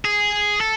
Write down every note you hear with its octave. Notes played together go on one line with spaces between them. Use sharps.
G#4
A4